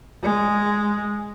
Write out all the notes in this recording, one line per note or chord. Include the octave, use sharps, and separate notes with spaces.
G#3